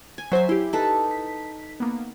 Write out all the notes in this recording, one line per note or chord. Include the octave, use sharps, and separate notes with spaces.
G#5
F#3 C5 E5 G#5
E4 G4 C6
D#4 A4 B4
B6
A#3 B3